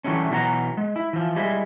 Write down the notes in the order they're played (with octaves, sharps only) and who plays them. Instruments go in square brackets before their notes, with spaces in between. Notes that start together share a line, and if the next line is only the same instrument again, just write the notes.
[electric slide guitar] E3 F#3 G3 A3 C#4
B2 E3 F#3 B4 F#5 A#5
G#3
E4
E3 F3
G3 G#3 E4